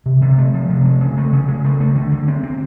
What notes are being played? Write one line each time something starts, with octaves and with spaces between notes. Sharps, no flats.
C3
C3
A3
F3
C3
A3
C#3
A3
C#3
C#3
A3
A3
D3
D3
C4
C4